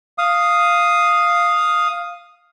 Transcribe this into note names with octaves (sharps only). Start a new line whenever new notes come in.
F5 D#6